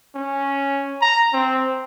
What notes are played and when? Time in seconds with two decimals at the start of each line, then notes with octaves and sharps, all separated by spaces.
0.15 C#4
1.02 A#5
1.33 C4